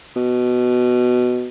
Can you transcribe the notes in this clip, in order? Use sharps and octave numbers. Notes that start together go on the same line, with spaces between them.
B2